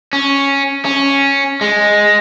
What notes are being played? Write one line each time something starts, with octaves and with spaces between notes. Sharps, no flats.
C#4
C#4
G#3